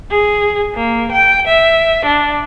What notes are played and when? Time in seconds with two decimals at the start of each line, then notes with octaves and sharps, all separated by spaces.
0.11 G#4
0.75 A#3
1.12 G5
1.48 E5
2.04 D4